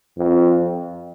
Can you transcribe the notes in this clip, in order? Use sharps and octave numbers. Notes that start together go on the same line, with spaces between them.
F2